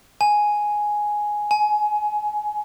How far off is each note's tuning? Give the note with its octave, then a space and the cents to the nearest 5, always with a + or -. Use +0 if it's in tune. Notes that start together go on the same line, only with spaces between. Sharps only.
G#5 +5
G#5 +25